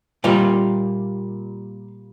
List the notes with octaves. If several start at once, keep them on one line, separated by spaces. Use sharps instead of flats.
A#2 G3 A#3 F4 F5